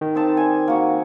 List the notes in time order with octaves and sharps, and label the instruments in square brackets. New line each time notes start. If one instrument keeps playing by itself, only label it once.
[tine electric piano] D#3
[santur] C4 D#4 A5
G3 G#5
A#3 F#4